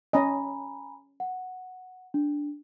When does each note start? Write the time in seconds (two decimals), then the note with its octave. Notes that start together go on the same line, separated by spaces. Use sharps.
0.13 C#4 D#5 G#5 A#5 B5
1.20 F#5
2.14 D4